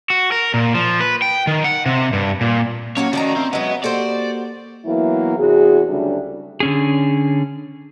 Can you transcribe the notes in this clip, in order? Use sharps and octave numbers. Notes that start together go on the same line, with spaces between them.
F#4
A#4
A#2
F3
B4
G5
D#3
F#5
C3
G2
A#2
F#3 A#3 C#4 F#4 C#5
D#3 F3 F#4 D5 A#5
C4 E5
F#3 G#3 B3
A#3 F#4 G4 A4 C5 D5
E3 F#3 A#3 B3 E4
E2 C3 F#4 G#4
D2 C#3 F#3 G3 A3 D4
D3 C#4 G#4